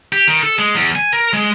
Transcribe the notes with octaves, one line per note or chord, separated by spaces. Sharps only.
G4
D#3
A4
G#3
E2
G#5
A#4
G#3